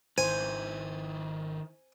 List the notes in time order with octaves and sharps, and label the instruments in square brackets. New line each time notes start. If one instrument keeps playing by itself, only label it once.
[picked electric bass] G#1 [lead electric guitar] D#3 E4 [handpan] C5 [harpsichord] G#5